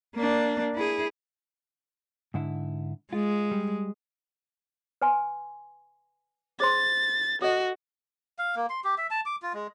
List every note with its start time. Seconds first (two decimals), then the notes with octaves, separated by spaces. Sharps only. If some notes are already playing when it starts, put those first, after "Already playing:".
0.15 A#3 D4
0.75 E4 G#4
2.34 G#2 D3 E4
3.13 G#3 F4
3.51 G3
5.02 B4 G#5 C6
6.60 G#4 C5 C6 A6
7.42 F#4 A4 D#5
8.39 F5
8.56 A#3
8.69 C6
8.84 G4
8.98 E5
9.11 A5
9.26 D6
9.42 F4
9.54 G#3